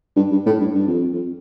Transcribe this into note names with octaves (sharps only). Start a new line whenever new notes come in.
G2
G2
A2
G2
G2
F2
F2